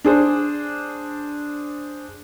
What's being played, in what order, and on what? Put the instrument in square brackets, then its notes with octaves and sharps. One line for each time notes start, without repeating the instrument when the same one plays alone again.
[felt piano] D4 G#4 C5